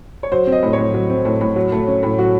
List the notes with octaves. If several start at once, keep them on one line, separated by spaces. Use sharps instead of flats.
C#5
F#3 C5
C4
D#5
A2
A2 C#5
F#3
C4
A2
A2
F#3
A3
C#4
A2
F#3 F#4